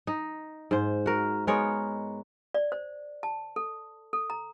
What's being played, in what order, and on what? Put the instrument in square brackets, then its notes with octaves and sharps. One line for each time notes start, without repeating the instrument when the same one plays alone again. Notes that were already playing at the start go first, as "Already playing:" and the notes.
[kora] D#4
G#2 C5
F#4 A#4
G#3 B3 A#4 C#5
[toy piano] D5
C5
A5
A4
A4
A#5